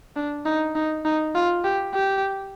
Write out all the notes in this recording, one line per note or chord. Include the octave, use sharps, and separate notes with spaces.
D4
D#4
D#4
D#4
F4
G4
G4